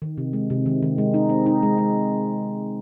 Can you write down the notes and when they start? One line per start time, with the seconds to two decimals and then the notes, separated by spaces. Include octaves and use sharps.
0.02 D#3
0.18 C3
0.33 G#3
0.50 C3
0.66 D#3
0.82 D#3
0.98 G#3
1.14 D#4
1.29 C4
1.46 D#4
1.63 G#3
1.78 G#3